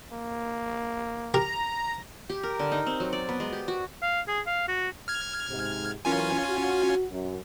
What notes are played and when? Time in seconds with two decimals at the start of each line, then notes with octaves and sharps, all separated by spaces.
0.12 A#3
1.34 G4 A#4 A#5
2.29 G4
2.43 A#4
2.59 D3
2.72 D#4
2.87 C4
3.00 F#3
3.13 D5
3.29 B3
3.40 G#3
3.53 G4
3.68 F#4
4.02 F5
4.28 G#4
4.47 F5
4.68 F#4
5.08 F6 G#6
5.49 G#2 C3
6.05 E3 F#3 C#4 F4 A#4 G#5
6.50 F#4
7.11 F#2